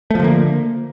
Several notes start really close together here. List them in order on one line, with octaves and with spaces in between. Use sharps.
A3 F3 D3 A#3